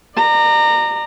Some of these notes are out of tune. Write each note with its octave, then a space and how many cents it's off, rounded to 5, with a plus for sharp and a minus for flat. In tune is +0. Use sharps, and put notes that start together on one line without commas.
D5 +30 A#5 -15